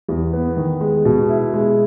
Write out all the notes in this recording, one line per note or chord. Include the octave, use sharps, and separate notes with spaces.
E2
B3
D#3
G#3
B2
E4
G#3